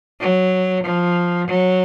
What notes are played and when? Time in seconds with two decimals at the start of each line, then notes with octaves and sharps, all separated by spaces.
0.20 F#3
0.84 F3
1.48 F#3